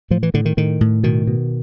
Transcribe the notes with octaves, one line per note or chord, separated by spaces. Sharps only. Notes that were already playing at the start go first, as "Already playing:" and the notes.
A2 F3
E3
A2 D3
D#3
A2 D#3
A2
B2 D#3
B2